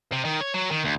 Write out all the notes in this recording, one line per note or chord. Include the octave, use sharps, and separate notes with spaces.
C3
D#3
C#5
F#3
D#3
D2